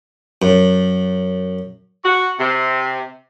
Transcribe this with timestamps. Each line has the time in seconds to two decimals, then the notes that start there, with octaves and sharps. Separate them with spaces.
0.42 F#2
2.04 F#4
2.39 C3